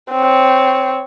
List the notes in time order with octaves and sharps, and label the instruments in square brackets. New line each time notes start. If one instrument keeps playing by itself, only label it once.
[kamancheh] C4 C#5